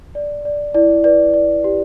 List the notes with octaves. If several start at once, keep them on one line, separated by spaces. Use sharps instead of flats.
D5
D5
E4 D5
B4 D5
D5
G4